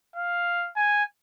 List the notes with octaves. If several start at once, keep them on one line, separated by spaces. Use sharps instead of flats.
F5
G#5